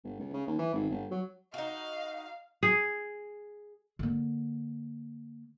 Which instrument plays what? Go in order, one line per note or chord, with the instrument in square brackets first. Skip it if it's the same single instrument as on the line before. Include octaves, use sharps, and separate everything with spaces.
[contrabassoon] G1
C#2
C#3
D#2
E3
G#1
G1
F#3
[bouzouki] D#4 F#4 [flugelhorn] D#5 [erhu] F5
[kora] G#4
[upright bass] D3 A#3